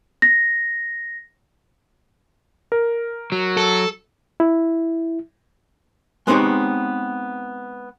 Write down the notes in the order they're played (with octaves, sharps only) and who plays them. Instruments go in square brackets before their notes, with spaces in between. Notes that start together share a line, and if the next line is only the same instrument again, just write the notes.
[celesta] A#6
[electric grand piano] A#4
[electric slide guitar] F#3
[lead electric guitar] A4
[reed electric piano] E4
[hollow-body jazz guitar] G#3 B3 C4 D#4 G4 C#5